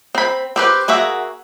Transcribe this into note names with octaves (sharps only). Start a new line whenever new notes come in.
C4 B5
C4 G4 B4
A#3 F#4 G#4 E5